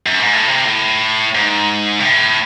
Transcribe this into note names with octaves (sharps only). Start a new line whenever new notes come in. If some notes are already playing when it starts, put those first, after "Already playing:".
F#2
G#2
A2
C3
A2
G#2
C3
A2